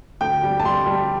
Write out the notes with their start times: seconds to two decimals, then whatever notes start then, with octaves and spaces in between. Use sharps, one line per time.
0.21 D2 G5
0.43 G3
0.60 A5
0.64 G3 C6
0.86 G3